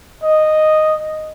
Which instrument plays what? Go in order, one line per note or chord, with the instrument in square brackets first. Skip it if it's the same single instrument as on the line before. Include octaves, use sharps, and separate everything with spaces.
[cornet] D#5